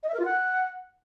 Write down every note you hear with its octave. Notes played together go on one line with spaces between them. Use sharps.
D#5
E5
A#4
F4
F#5